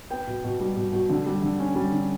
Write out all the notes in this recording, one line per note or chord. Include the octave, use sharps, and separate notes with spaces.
B3 G5
B2
B2
G3
B2
B2
D3
G3
D3
C#4
G3
D3